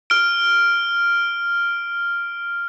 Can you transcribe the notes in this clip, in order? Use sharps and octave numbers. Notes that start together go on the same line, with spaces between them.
F6 D7